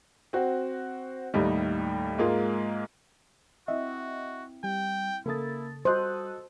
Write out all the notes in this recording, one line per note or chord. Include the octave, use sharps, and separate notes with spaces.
C4 F#4
D#2 A2 G3 D#4
G#2 G#3 A#3 F4
C4 E4 F#4 D#5 E5
G3 G5
C#3 A#3 E4 A4 D#6 A6
G3 F#4 A4 C5 D#5 A5 D#6 F#6